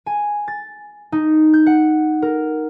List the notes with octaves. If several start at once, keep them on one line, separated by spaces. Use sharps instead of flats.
G#5
A6
D#4
G6
F#5
A#4